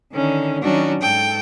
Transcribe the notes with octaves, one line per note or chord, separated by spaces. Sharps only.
D3 D#3 C#4
D#3 F#3 C#4 D4 F#4
G#2 A4 G5